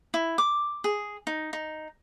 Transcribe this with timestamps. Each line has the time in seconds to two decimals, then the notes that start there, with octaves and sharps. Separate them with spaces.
0.14 E4
0.38 D6
0.84 G#4
1.27 D#4
1.53 D#4